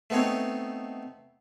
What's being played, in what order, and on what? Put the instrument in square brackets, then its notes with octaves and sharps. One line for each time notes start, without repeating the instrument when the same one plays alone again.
[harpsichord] A3 B3 C4 D#4 C#5